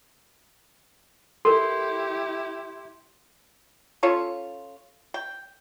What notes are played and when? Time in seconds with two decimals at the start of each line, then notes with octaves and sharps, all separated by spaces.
1.45 E4 G4 A4 A#4 C6
4.03 C#4 F4 A4 C#5
5.14 G5